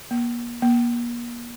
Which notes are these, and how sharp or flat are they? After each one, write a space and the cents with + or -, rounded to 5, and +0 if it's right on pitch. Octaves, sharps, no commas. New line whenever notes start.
A#3 +40
A#3 +40